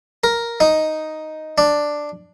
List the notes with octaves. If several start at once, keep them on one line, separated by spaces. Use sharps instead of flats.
A#4
D#4
D4